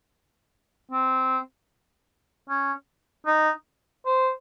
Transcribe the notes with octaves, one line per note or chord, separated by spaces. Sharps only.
C4
C#4
D#4
C5